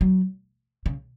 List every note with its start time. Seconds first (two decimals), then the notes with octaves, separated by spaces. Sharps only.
0.01 F#3
0.86 C#3